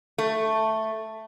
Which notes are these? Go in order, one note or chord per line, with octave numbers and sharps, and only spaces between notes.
A3